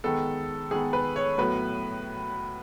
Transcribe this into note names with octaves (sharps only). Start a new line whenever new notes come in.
D#3 G#3 B3 A4
D#3 G#3 B3 G#4
B4
C#5
A2 F#3 B3 B4